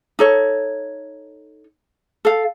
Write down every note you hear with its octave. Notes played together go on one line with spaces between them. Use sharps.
D#4 A4 C#5
A4 F5